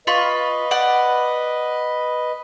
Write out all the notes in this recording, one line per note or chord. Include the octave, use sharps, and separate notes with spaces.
F4 B4 D#5 B5 C#6
D5 F#5